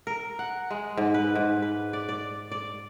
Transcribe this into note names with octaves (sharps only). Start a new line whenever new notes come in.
A#4
F#5
G#3
G#2
B4
G#2
B4
D5
D5
D5